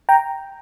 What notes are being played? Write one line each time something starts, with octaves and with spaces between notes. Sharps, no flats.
G5 A#5